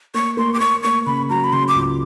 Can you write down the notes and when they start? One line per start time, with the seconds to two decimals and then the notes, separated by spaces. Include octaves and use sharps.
0.14 A#3 C#6
0.37 A#3 C6
0.54 D6
0.60 A#3 C#6
0.83 A#3 C#6
1.06 C#3 B5
1.30 F#3 A#5
1.44 B5
1.52 C#3 C6
1.68 D6
1.75 C#2